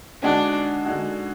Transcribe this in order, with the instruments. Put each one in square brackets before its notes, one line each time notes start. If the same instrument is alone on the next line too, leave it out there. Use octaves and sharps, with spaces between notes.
[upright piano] D3 G#3 D#4 F#4 [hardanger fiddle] D4
[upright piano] D3 G#3 D#4 F#4